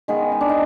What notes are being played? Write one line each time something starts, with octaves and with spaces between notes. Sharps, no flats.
D#3 G#3 B3
D#4
D4
D#4